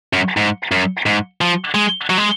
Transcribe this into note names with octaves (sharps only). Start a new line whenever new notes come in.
F#2
G#2
F#2
G#2
F3
G#3
F#3
G#3